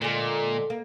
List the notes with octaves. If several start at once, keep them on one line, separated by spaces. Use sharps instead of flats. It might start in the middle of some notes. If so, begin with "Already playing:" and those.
A#2 D3 G#3
A#3